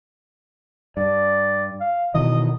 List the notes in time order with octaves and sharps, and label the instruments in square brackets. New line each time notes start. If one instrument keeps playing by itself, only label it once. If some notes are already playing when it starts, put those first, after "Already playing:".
[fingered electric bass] G2 [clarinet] D5
[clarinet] F5
[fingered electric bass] B2 D#3 E3 [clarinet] D#5